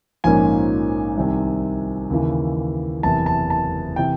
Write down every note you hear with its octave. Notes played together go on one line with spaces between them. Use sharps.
A#1 G#2 F3 A#3 C#4 G#5
C2 C3 D#3
D#2 C#3 E3
F#1 E2 C3 A5
A5
A5
C3 E3 G5